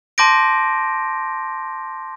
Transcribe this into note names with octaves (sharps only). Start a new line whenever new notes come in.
A5 C6 D6 G6 A#6 D7